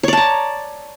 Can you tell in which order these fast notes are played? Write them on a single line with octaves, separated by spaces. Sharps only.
C#5 D5 A5 A#5